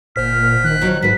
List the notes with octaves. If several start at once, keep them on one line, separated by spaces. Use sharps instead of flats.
G1 A#2 C5 F6 B6
D#3 F#6
D#3 F3 F#3
G#2 F#4 B4 B6